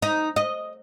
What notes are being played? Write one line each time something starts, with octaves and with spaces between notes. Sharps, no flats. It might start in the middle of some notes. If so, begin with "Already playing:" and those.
D#4
D#5